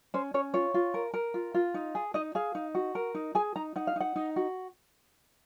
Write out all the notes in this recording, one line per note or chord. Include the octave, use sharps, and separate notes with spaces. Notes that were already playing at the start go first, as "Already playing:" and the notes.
C#4 C5
C#4 C#5
F4 C#5
F4
A#4
A#4
F4
F4
D#4
G#4
D#4 D#5
G#4 F5
D#4
F#4
A#4
D#4
G#4 G#5
D#4 A#5
D#4 F#5
F5
D#4 F#5
D#4
F#4